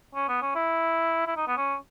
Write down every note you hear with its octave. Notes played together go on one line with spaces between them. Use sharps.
C#4
B3
C#4
E4
E4
D#4
B3
C#4